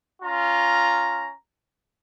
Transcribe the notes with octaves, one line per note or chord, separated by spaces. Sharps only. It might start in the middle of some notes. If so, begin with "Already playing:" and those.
C#4 F4 A#5